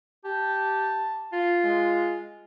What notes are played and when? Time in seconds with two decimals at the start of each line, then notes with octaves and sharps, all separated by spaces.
0.25 G4 A5
1.33 F4
1.64 G#3